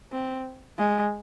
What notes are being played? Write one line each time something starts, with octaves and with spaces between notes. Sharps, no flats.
C4
G#3